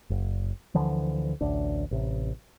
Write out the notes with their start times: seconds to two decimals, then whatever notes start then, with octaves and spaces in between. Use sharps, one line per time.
0.10 F#1
0.75 D2 D3 E3 F3
1.41 A1 D2 D4
1.91 A1 C3